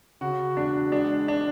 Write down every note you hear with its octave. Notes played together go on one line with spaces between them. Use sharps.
C#3 F#4
E1 D4
G#3 D4
D4